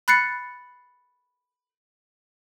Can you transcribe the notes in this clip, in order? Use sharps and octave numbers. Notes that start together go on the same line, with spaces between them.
B5 F#6 A6 C7 C#7